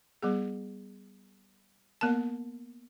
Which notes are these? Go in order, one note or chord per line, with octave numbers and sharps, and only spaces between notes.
G3 B3 G#4
A#3 B3 A#4 A5